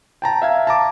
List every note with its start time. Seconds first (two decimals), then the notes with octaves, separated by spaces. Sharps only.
0.22 G5 A5 A#5
0.42 E5 F5 G#6
0.67 A5 A#5 D6